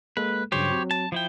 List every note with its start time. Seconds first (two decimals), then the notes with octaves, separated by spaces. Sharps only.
0.17 G#3 A#3 A4 B4
0.52 G2 C#3 F#3 G4 C5 C#5
0.71 F#3 C4
0.91 A5
1.12 F3 E4 G5